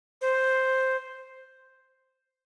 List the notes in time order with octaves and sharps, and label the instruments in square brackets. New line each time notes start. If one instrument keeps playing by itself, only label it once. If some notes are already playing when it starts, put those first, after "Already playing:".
[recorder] C5